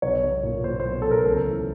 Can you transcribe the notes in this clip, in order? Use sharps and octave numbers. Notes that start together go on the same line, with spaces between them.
B1 C#5
B1
A#2
A#2 C5
C5
B1
A4
B1
A#4
C#2 A4
E3